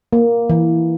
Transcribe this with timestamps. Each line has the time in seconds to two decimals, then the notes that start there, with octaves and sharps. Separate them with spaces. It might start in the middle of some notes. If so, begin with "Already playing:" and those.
0.13 A#3
0.50 E3